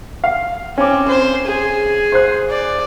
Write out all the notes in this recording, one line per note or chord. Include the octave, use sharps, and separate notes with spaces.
F5
C4 C#4 D6
C5
G#4
C5 F#6
D5